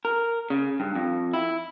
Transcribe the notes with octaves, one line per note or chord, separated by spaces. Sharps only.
A#4
C#3
G2
F2
E4